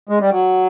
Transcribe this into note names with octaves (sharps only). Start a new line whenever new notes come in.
G#3
G3
F#3